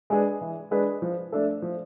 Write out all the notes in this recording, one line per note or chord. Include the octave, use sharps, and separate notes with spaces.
G#3 D4 G#4 B4
E3
G#3 D4 G#4 B4
F3
A3 D4 A4
F3